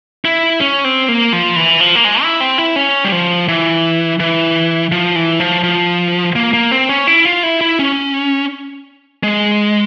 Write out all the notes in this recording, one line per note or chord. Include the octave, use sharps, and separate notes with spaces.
E4
C#4
C4
A#3
F3
E3
F3
A#3
G#3
E4
C4
E4
C#4
G3
F3
E3
E3
F3
E3
F3
F3
A#3
A#3
C4
C#4
E4
F4
E4
E4
C#4
G#3